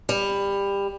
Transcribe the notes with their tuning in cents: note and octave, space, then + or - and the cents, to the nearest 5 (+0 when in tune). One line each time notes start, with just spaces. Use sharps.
G3 +20